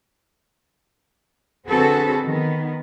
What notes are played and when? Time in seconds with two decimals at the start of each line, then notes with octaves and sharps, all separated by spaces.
1.68 D3 C4 F#4 G#4 A4 B4
2.25 D#3 B3